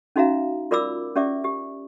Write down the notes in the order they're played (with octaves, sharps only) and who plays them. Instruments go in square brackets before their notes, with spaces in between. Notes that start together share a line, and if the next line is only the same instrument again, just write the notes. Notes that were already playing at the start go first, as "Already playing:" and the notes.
[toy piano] C#4 D#4 F#4 E5 F5 A#5
F4 A#4 D5 B5 D6 E6
C#4 G4 D5 E5 D6
G4